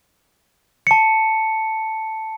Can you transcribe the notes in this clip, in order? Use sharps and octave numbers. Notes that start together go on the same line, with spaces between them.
A5 C#7